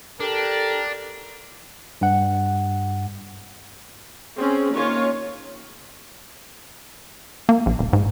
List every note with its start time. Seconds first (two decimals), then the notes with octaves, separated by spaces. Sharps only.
0.20 D4 G4 A4 A#4
2.01 G2 F#5
4.40 C4 C#4 G#4
4.72 D#3 A#3 C#4 F4 C#5
7.49 A#3
7.66 A#1
7.79 D#1
7.93 G#2